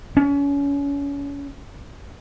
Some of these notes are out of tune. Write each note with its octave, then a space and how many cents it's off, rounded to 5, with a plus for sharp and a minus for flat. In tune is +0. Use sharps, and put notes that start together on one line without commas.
C#4 +30